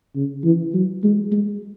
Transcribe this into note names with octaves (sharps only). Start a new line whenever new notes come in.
C#3
E3
F#3
G#3
G#3